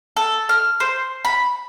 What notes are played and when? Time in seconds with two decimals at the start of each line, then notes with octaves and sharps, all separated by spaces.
0.17 A4
0.49 F6
0.80 C5
1.25 B5